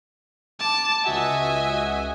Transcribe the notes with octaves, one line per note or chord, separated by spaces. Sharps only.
A5 D6
C#2 F#4 D#5 E5 F#5 G#5